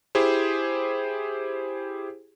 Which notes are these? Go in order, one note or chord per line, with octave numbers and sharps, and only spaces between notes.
E4 G4 G#4 C5